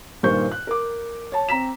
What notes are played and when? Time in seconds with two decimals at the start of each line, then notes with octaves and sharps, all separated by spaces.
0.23 G2 A#2 D#3 C5 C#6 G6
0.52 F#6
0.67 A#4 D6
1.32 C#5 A5
1.49 C4 A#5 B6 E7